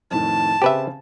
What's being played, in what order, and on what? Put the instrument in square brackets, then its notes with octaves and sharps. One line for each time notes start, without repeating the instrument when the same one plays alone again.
[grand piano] F2 A2 D#3 [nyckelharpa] A5
[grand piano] C#3 C4 [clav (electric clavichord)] G4 B4 E5